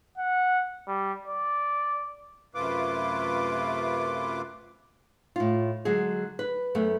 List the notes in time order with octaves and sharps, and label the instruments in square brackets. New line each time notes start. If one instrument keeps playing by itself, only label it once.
[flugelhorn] F#5
G3
D5
[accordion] F#2 C3 A3 F4 B4 D6
[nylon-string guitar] A2 F4
D3 F#3 G#3 G#4
B4
F#2 A3 B3